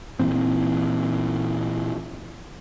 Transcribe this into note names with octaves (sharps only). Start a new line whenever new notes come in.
A#2 E3 C4